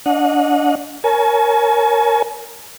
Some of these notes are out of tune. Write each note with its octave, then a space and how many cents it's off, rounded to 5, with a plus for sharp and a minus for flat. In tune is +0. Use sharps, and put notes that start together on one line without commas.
D4 -20 D#5 +0 F#5 -30
A#4 +0 C#5 +0 G#5 +40